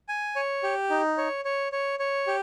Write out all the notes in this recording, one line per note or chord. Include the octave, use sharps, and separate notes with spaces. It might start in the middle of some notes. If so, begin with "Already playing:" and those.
G#5
C#5
G4
D#4
C#5
C#5
C#5
C#5
G4